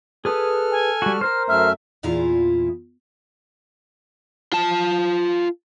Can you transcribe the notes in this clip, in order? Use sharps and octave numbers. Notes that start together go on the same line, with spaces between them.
G#4 A4 B4 D#6 F6
G#5
G3 F#4
A#4 C5 F6
F#2 A3 E5 F6
E2 A#2 E4 F4 G#4 A#5
F4 A5